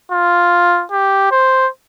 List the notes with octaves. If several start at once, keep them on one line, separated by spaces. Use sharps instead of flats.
F4
G4
C5